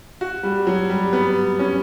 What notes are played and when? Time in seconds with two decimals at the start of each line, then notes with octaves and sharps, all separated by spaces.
0.21 F#4
0.43 G3
0.67 F#3
0.90 G3
1.13 B3
1.59 C#4